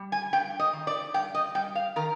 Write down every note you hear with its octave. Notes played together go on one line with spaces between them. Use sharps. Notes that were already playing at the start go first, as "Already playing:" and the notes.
Already playing: G3
G#5
G2 G5
D#5
D#3
D5
G2 G5
D#5
G3 G5
F5
D#3 A#4